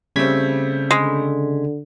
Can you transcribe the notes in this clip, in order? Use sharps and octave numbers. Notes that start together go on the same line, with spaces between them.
C#3 G3 A3 C4 G#6 B6
D3 G#3